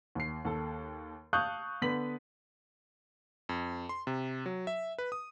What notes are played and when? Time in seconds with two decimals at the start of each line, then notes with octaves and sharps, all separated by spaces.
0.15 D#2 C7
0.45 D#2 A4
1.33 F5 A5 C#6 D#6 F#6 G6
1.82 D3 B3 B4 B6 F#7
3.49 F2
3.89 C6
4.07 C3
4.46 F#3
4.67 E5
4.98 B4
5.12 D#6